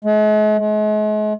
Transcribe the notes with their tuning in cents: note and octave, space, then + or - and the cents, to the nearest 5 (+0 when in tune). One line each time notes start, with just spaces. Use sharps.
G#3 +45
G#3 +40